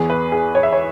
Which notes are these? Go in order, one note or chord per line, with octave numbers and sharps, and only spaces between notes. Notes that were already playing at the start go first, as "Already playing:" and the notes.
Already playing: E2 E3 B3 G#4
B4
G#4
C#5
E5
C#5